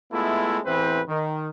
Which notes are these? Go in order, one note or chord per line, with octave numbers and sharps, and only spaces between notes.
G#3 A3 B3 E4 F4
A1 E2 E3 C4 B4 C5
D#3